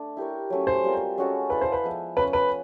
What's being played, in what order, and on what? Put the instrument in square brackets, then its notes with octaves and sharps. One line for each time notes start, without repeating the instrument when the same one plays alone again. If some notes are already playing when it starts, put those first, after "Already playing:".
Already playing: [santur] A3 D4
E4 G4 A#4 C#5
F#3 A3 C#4
[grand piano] C5
[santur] G3 C4 F4 A#4
G#3 C#4 F#4 A4
[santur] E4 A4 D5 F5 [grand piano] B4
[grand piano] C5
B4
[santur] F3 G#3 B3 E4
[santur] A3 C#4 F4 [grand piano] B4
[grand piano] B4